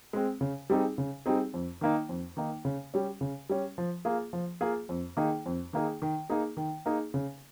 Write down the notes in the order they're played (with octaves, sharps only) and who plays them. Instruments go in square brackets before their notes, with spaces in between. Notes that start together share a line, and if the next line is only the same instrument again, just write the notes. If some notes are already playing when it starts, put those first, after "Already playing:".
[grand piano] G#3 C4
C#3
G3 C4 D#4 G#4
C#3
G3 C4 D#4 G#4
F2
D#3 A#3 D#4
F2
D#3 A#3 D#4
C#3
G3 C#4
C#3
G3 C#4
F3
A#3 F4 G#4
F3
A#3 F4 G#4
F2
D#3 A#3 D#4 G#4
F2
D#3 A#3 D#4 G#4
D#3
A#3 D#4 G#4
D#3
A#3 D#4 G#4
C#3